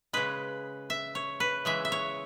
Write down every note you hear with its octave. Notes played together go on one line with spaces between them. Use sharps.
C#3 G#3 B4
E5
C#5
B4
C#3 E3 G#3 E5
E5
C#5